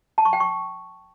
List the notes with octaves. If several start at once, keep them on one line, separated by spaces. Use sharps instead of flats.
A5
C#6
G5
C#6